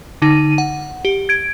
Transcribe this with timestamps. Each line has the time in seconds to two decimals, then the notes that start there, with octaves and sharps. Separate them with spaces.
0.22 D3 D#4 D#7
0.58 F#5
1.05 G4
1.29 G#6 D7